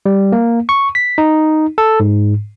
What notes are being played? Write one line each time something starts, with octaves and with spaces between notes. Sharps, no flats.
G3
A#3
C#6
B6
D#4
A4
G#2